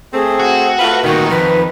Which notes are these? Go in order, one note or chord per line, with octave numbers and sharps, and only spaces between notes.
A3 C4 G#4
F#4
A3 F4 B4
D2 A#2 D#3 F#4
F2 B4